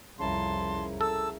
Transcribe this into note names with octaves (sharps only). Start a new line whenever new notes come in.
C2 F2 C#3 E4 A#4 A5 C6
A4 A5 E6